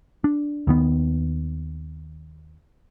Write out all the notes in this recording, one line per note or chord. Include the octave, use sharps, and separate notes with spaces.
D4
D#2 D#3 B3